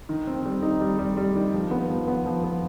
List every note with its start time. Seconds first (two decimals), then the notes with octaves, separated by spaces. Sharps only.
0.09 D#3
0.27 C4
0.45 G3
0.63 D#4
0.81 G3
0.99 G3
1.17 G3
1.36 D#3
1.54 F3
1.71 B3
1.89 F3
2.08 B3
2.26 F3
2.44 B3